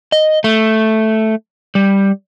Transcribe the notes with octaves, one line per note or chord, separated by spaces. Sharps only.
D#5
A3
G3